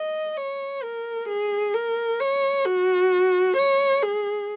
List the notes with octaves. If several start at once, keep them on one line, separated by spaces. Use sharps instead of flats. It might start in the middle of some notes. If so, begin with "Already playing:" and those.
Already playing: D#5
C#5
A#4
G#4
A#4
C#5
F#4
C#5
G#4